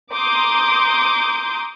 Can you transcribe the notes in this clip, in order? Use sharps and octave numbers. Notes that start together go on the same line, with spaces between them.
A#5 C6 D6 D#6 G6